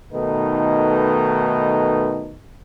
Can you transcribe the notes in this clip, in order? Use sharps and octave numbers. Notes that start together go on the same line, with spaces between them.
B2 D#3 A3 D#4 A4 B4